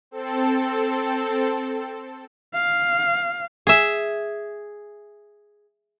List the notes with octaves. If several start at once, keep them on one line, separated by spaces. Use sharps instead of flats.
C4 A4
F5
G#4 E5